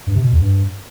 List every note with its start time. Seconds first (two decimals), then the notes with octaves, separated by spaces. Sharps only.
0.07 G2
0.15 C3
0.24 B2
0.32 E2
0.41 G2